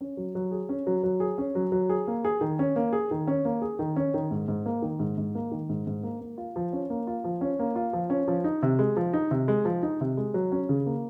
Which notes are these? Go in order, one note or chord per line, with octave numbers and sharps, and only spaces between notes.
C#4
F#3
F#3
G#4
C#4
F#3
F#3
G#4
C#4
F#3
F#3
G#4
A#3
G#4
D#3
C#4
A#3
G#4
D#3
C#4
A#3
G#4
D#3
C#4
D#3
G#2
G#2
A#3
D#3
G#2
G#2
A#3
D#3
G#2
G#2
A#3
A#3
F4
F3
C#4
A#3
F4
F3
C#4
A#3
F4
F3
C#4
F3
D#4
C3
G#3
F3
D#4
C3
G#3
F3
D#4
C3
G#3
F#3
C#4
C#3
A#3